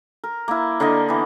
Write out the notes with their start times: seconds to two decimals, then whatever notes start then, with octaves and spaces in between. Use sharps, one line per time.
0.24 A#4
0.48 A#3 E4
0.80 D3 A#3 D4 D#5
1.09 E3 B3